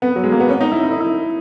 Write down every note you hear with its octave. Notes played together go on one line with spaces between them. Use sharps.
B3
F#3
G#3
A#3
B3
C#4
D#4
E4
E4
D#4
E4